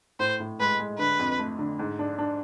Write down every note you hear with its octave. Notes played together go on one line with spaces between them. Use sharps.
A2 C5
A2
G#3 B4
G#3
D3 B4
F2
A3
D3
G#2
D4
D4